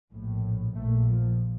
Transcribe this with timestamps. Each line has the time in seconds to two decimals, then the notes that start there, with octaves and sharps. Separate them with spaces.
0.12 A#1 A2
0.75 A#1 A#2 A3
1.08 F3